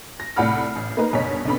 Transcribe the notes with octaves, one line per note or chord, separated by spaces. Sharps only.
A#6
C2 A2 D5 F#5 B5 F6
A1
A#3 D#4 B4 A#5
F#1 G2 B2 C#5 D#5 B6
C2 D3 B3 C#4 B5